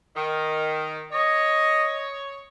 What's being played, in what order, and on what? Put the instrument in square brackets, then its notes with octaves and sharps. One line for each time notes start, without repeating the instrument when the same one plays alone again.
[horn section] D#3
[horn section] C#5 [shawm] D#5